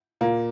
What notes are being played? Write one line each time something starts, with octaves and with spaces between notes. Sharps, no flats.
A#2 A#3